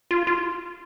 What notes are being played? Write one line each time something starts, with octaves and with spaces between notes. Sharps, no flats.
F4
F4